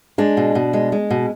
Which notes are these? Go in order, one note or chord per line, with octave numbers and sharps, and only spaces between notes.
G#3 D4
B2
B2
G#3
G#3
B2